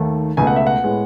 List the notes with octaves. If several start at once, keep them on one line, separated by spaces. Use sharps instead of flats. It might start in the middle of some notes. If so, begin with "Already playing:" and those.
Already playing: D#2 D#3 A3
C#2 B2 A3 G#5
F#5
E5
F#5
A2 G#3 B3